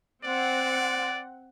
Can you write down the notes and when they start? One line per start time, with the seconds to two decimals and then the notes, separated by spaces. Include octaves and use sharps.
0.24 C4 D5 F#5